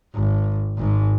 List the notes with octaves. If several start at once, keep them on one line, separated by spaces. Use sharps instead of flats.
G#1
G#1 G#2